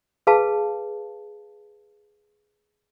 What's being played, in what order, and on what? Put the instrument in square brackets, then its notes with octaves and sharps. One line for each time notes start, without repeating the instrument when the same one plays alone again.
[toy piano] G#4 B4 F5 A5